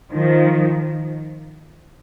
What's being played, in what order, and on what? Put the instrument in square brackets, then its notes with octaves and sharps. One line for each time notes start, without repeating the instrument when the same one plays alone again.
[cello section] D#3 F3